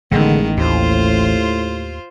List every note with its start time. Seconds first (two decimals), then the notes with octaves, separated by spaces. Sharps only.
0.11 A1 D3 D#3 G#3 B3
0.58 D#2 A2 F4 C5